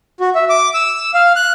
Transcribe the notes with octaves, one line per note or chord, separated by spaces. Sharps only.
F#4
E5
D6
E6
F5
F#6